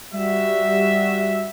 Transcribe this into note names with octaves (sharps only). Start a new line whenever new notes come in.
G3 F#4 E5